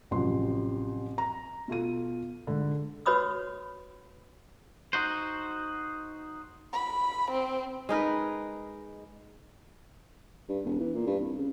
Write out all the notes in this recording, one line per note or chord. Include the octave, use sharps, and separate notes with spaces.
A1 C3 F3 F#3 C6
A#5
B2 F4 A4 D#7
G#2 D3
F#4 B4 C#5 B5 D#6 E6
D#4 F#4 C5
B5
C4
G#3 D#4 A#4 B4
G2
E1
E3
A#2
G2
C2
C#3